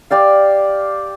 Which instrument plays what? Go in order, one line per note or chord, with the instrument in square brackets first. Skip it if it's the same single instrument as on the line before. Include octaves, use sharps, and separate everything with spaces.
[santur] G4 D5 F5